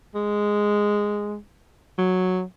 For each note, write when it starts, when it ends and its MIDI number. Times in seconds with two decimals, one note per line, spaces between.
0.15 1.36 56
1.98 2.42 54